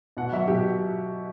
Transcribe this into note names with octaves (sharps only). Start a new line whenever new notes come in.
B2 F#5
F#3 E5
B2 G4